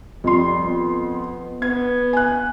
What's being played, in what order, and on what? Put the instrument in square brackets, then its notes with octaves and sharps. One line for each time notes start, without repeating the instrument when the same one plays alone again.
[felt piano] F2 C6 [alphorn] G3
[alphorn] B3
[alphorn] B3 [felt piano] G#6
[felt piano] G#5 F#6